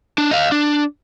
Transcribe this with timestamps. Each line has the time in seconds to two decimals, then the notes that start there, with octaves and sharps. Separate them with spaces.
0.18 D4
0.31 D#5 F5
0.52 D4